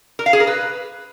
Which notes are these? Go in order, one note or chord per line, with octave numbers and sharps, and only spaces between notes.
A#4
F5
G#4
A#4
B4